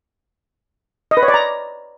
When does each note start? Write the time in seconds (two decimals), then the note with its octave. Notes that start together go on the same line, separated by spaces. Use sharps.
1.11 D#5
1.17 B4
1.23 C#5
1.28 D5
1.34 A#5